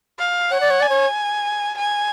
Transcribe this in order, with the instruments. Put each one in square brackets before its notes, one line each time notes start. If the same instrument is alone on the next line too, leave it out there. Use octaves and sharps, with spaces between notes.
[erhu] F5
[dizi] C#5 [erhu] F#5
[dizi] D5
C#5
[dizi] D5 [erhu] G#5
[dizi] C#5
[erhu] G#5